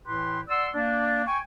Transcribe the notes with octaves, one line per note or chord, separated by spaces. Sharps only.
A2 E3 E4 G4 B4 C6
D5 F#5 C6 E6
A#3 D4
G5 G#5 C#6